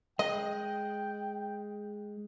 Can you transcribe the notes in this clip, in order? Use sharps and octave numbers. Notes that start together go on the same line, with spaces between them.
G#3 D#5 G5